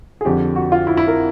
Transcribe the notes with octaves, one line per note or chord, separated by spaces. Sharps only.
G#4
F2 D3 G4
F#4
F4
E4
E4
A#4